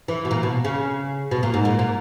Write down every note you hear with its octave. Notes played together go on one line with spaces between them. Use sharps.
E3
B2
A#2
B2
C#3
B2
A#2
G#2
A#2
A#2